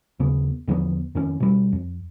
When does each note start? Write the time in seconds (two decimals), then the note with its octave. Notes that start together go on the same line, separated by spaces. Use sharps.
0.19 D#2 C#3 B3
0.68 E2 D3 F3 B3
1.15 F2 D#3 C#4
1.40 B2 G3
1.73 F2